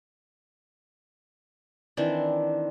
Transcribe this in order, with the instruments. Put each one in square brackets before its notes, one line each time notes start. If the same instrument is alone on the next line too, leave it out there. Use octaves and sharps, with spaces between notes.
[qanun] D#3 E3 C4 D4